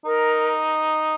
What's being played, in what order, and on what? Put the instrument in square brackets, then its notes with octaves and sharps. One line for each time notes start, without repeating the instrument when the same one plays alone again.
[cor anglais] D#4 [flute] A#4